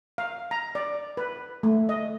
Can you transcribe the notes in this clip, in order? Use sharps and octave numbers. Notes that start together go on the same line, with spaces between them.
F5
A#5
D5
B4
A3
D#5